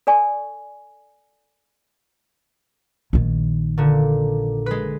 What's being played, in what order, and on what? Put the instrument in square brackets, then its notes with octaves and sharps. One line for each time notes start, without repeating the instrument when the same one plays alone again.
[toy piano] A4 D5 G#5 C#6
[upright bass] A#1 D#3
[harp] A#2 D3
G#3 B4